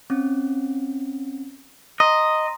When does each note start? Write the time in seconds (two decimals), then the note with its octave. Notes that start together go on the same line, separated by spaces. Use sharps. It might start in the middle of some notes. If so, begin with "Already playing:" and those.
0.10 C4 C#4
2.00 D#5 A#5 C6